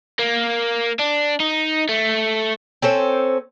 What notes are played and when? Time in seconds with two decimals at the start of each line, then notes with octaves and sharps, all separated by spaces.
0.19 A#3
0.99 D4
1.40 D#4
1.89 A3
2.82 C4 C#4 A4 C5